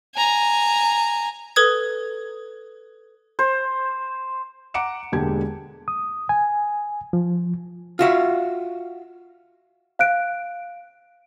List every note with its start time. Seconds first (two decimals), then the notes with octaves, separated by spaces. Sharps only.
0.15 G#5 A#5
1.56 A4 B4 D#6 G#6
3.39 C5
4.74 F#5 A#5 D6 C#7 D7 E7
5.12 E1 D3 G#3 A#3 G4 G#6
5.88 D#6
6.29 G#5
7.13 F3
7.99 F4 F#4 E5
9.99 F5 F#6 D7